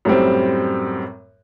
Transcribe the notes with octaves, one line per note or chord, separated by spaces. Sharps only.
F#2 A2 G3 C4